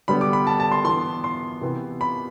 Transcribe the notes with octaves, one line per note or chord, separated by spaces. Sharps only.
D3 G3 B3 B5
D6
B5
A5
A5
C6
E3 B3 C6
C6
C3 E3 B3
B5